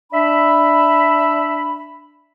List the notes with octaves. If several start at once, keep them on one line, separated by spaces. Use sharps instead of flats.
D4 E5 B5